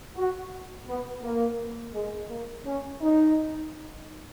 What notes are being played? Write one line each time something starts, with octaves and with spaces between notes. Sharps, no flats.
F#4
B3
A#3
G#3
A#3
C#4
D#4